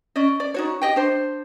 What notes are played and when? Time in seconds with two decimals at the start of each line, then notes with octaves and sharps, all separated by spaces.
0.16 C#4 D5 D#5
0.40 D5
0.54 D#4 F#4 C#5
0.82 G4 D#5 G5
0.96 D4 C5